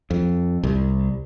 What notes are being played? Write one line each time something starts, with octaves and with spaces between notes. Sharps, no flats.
F2
C2